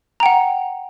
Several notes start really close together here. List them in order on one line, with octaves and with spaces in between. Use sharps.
A#5 G5 F#5